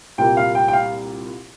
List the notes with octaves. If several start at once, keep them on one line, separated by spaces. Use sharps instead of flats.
C2 A#2 G3 A#3 G5
F5
G5
G5
F5